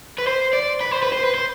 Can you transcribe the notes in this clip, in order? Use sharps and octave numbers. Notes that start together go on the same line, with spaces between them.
B4
C5
D5
B4
C5
B4
C5
B4
C5